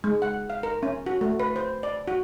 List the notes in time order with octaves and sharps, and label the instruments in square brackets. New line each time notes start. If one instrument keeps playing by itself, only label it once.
[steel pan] G#3
F#5
F5
A#4
C#4
F#4
A3
B4
C5
D5
F#4